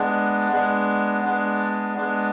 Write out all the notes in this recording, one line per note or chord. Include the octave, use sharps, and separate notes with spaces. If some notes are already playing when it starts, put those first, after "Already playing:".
Already playing: G#3 B3 D4
G#3 B3 D4
G#3 B3 D4
G#3 B3 D4